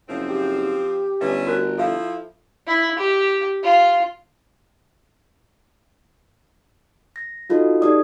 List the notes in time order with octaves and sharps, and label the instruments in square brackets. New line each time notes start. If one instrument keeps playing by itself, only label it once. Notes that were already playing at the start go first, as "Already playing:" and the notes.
[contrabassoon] F#1 [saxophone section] F3 C4
[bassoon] G4
[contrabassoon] G1 [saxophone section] A3 C#4 [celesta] B4 E5
[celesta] F#4 A#4 F#6
[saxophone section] F3 E4 [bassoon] F4 [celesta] A4 E5 F5
[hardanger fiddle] E4
G4
F4
[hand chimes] A#6
D#4 F4 F#4 A4 D#5
D#4 G4 A4 D5 D#6